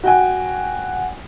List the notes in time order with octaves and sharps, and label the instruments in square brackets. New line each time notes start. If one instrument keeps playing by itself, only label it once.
[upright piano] F#4 G5 G#5